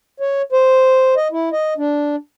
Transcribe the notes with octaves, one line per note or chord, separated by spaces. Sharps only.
C#5
C5
D#5
E4
D#5
D4